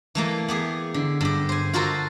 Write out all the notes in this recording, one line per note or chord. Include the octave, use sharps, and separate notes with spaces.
E3 A3 A#3
B3 G4 G#4
D3
G2 G4
C5 G#5
F4 F#4 A4 A#4 C5